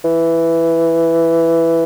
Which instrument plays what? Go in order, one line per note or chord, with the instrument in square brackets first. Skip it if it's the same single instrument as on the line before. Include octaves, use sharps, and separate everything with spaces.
[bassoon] E3